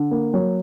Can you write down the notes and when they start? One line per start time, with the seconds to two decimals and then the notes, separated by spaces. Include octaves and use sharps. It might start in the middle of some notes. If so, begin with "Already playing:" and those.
Already playing: D3
0.11 A#3
0.34 F#3